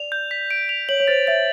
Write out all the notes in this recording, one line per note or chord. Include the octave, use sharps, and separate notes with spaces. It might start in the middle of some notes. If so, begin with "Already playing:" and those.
Already playing: D5 F7
G6
B6
D7
F7
C#5 F#7
C#5
C5 A6
E5 A6